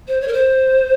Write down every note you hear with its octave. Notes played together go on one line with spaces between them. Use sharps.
C5
C#5
A#4
C5